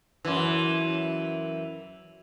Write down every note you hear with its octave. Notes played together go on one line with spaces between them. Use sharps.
F#2 E3